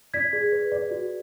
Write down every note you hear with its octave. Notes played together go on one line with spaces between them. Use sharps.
D5 G#6 B6
G#4
B4
D5
F#4